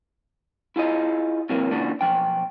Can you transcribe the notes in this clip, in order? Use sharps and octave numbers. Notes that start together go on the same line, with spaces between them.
E4 F4 G#4 D#5
C3 E3 F#3 A#3
A#2 C#3 E3 D4 F#4
B1 F#2 F3 G5